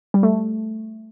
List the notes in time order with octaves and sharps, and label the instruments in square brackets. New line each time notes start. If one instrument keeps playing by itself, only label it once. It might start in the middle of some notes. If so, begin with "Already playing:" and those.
[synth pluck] G3
A3